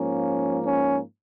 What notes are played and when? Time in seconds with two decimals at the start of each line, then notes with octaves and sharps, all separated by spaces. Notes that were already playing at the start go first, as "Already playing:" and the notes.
Already playing: G#2 F3 A#3 C#4
0.66 C#4